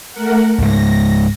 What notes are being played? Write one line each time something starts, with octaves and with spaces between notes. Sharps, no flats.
A3 A#4 F#5
C#2 G#2 G#3 A#6